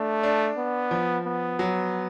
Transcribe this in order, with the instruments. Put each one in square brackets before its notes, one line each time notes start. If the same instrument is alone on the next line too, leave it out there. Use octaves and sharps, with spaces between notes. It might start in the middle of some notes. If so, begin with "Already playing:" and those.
Already playing: [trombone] A3 [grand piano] D4
[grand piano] D4
[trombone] B3
[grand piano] F3
[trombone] B3
[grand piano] F#3